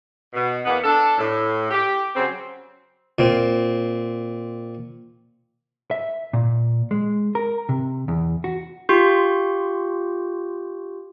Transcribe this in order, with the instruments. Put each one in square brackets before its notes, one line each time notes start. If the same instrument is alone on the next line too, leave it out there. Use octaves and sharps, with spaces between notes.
[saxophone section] B2
E2 A#3 B3
D4 A4
A2
G4
C#3 F#3 C4
[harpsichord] A#2 C4
[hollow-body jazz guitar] E5
A#2
G#3
A#4
C3
E2
F#4
[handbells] F4 G4 C6 C#6 G6